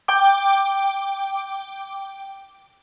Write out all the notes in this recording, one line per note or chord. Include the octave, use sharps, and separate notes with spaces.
G5 D6